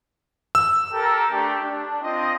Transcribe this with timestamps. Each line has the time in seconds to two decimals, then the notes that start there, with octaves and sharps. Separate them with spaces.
0.55 E6
0.93 G4 A4 A#4
1.32 A3 D4 G4
1.63 D4
2.02 C4 F4 D#5